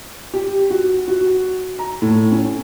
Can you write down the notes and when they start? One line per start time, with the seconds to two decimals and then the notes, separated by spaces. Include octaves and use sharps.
0.34 G4
0.70 F#4
1.08 F#4
1.79 A#5
2.02 A2
2.32 C#4